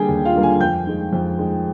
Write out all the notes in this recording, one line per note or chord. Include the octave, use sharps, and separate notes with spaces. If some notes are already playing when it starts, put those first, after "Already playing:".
Already playing: D3 G3 A#3 G4 G#4 G5 G#5
D#2
F4 F5
D3 G3 A#3
G#4 G#5
F2 G5 G6
D#3 G#3
F2
D#3 G#3